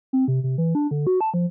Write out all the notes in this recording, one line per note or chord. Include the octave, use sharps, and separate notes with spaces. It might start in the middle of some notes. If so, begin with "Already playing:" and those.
C4
C3
C3
E3
D4
D3
F#4
A5
F3